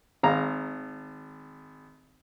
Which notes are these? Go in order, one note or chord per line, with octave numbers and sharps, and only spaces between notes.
G#1 F5 A#5